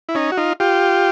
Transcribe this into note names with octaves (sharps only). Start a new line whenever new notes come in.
E4
C#4 D#4
F#4
D#4 F4
F4 G4